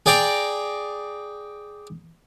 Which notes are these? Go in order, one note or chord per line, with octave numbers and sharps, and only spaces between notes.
G#4 D5 G5 A#5